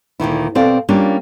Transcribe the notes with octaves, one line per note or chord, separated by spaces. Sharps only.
D2 A#2 D#3 E4
B2 C4 A4 D5 F5
G3 A#3 C#4 D4 F4